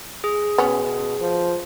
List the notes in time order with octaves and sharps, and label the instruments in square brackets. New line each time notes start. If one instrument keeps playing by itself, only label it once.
[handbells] G#4
[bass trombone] B2 [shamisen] B3 C#4
[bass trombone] F3